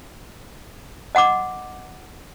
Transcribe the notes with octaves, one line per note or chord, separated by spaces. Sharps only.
D#5 F#5 C6 D6